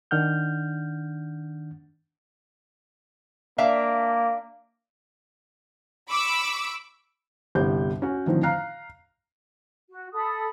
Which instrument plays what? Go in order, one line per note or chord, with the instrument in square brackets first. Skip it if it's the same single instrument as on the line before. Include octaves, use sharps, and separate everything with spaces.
[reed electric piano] D#3 D4 F#5 F6 G6
[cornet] A#3 [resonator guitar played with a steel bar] D4 E5 F5
[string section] B5 C#6 D6 E6
[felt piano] G1 C2 G3 G6
C#4 F#4
A2 D3 D#3 F3 C4
F5 A#5 F6 F#6 C7
[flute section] F#4
A4 B5 D#6